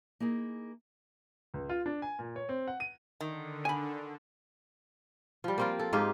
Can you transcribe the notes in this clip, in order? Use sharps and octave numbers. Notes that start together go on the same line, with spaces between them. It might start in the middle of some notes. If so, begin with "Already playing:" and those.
A#3 D#4 E4 G#4
C#2
F4
D4
G#5
A#2
C#5
C4
F#5
D#7
D3 D#3
G#5 B5
F3 G3
A#3 C4 F4
A4
G#2 D#4 G4 F5